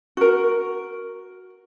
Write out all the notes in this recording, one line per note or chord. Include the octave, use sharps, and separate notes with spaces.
F#4 A#4